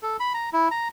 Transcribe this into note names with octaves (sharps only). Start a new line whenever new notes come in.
A4
B5
A#5
E4
A#5